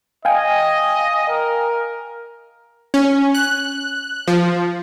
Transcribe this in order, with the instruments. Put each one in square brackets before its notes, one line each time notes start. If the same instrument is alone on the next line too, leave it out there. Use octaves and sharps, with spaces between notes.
[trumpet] D#5 [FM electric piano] F5 G5 G#5
[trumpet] A#4
[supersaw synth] C#4
F#6
F3